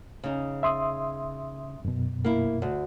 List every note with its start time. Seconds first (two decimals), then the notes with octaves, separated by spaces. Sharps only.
0.24 C#3 D#4
0.63 E5 C6 D#6
1.85 F#2 B2
2.24 A#3 E4
2.62 D2